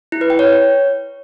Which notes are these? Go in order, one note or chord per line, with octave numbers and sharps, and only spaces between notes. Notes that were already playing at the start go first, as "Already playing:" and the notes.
E4
B4
G5
C#5